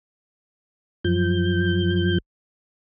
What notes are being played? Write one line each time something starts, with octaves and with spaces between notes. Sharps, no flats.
F#2 F3 G6